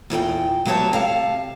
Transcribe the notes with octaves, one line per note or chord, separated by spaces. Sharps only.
E2 A#2 A#4 G5
D2 F#3 B3 G4 C#5 A5
C3 F5 A5